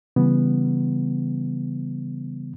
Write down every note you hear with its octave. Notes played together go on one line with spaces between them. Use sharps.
C#3 E3 G3 B3